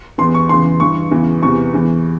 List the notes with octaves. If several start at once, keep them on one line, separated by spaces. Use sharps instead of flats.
E2 E3 C6
C#6
E2 C#3 E3 C6
G2 E3 C#6
E2 C#3 E3
E2 C3 E3 C#6
E2 E3